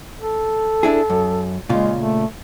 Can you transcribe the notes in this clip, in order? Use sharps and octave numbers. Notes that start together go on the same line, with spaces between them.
A4
D4 E4 G#4
F#2
A#2 C#3 G#3 F4
A3